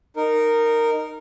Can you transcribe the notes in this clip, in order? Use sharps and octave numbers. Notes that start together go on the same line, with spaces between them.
D#4 A#4